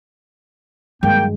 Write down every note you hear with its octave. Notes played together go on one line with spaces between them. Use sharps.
G2 D#3 F#3 G#3 A#3 G5